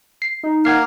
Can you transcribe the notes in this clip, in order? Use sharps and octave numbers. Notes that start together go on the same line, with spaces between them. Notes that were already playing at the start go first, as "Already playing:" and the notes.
C7
D#4
A#3 F#5 F6 G#6 C7